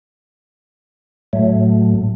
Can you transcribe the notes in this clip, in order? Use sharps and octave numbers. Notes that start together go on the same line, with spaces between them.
A2 F#3 A3